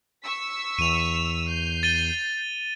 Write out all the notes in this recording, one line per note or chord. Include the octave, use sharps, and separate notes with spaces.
C#6 E6 B6
E2 D#7 F7
G6 C7
A6 D#7 G7